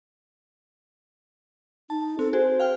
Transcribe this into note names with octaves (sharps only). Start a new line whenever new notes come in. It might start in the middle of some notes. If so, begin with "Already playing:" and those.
D#4 A5
C4 A4
F#4 G#4 C5
F5 G5 F6